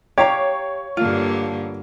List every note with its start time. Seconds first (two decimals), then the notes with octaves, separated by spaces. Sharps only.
0.18 G4 C#5 F5 A#5
0.97 G2 D3 A#3 F4